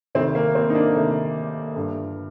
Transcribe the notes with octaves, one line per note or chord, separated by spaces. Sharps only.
D2 C3 D#3 C4
A#3
C4
D#4
A#3 D4
D2 C3 D#3
G1 G2 D3